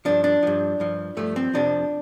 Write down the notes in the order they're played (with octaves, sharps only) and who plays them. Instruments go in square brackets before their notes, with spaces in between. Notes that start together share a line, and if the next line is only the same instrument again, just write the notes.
[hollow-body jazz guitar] G2 F3 D4
D4
G2 F3
G2 F3
G2 F3 A3
C4
F2 C3 F3 D4